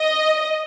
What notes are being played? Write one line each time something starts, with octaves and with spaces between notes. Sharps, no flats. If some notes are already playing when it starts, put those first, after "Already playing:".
Already playing: D#5